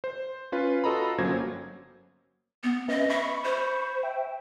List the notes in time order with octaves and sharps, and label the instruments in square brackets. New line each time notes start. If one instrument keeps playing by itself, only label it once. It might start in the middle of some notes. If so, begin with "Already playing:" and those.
[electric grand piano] C5
C#4 F4 B4
F4 F#4 A4 D#5 A#5 B5
G1 F#3 A#3 C#4 C5 G#6
[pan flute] B3
[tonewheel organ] C#4 B4 E5 [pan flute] D#5
[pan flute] E5 [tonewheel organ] B5 C#6
[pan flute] C5
[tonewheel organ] E5 G5